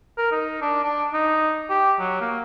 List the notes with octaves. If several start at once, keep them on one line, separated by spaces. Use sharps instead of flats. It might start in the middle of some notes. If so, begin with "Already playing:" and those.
A#4
D#4
D4
D4
D#4
G4
F#3
A#3